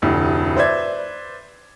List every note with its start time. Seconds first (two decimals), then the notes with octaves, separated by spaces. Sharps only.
0.02 F1 D2 A2
0.56 B4 C5 D5 E5 G#6